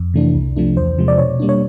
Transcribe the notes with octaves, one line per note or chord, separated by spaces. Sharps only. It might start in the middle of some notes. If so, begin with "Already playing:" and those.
Already playing: F2
C3 E3 A3 D4
C2
C3 F3 A3 D4
E2 C5
C3 F3 G#3
D5
B2 C#5
G3 A#3 D4
C#5